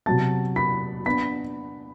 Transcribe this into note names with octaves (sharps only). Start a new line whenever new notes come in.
C3 F#3 B3 A5 A6
B5 B6
B3 D4 B5 B6